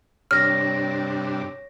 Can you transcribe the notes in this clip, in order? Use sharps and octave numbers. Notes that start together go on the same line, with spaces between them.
G2 C3 D4 C#5 F6 A#6